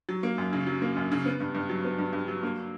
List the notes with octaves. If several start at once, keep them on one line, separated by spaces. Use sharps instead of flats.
F#3
A#3
F#2
C#3
F#3
A#3
F#2
C#3
B3
G2
G2
F#3
B3
G2
G2
F#3
A#3